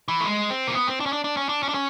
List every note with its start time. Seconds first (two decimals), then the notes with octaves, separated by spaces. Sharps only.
0.08 E3
0.20 A3
0.26 G#3
0.50 C4
0.67 A#3
0.75 B3
0.88 C4
1.00 D4
1.06 C#4
1.13 D4
1.24 D4
1.37 C#4
1.49 D4
1.63 C#4
1.69 D4
1.74 C#4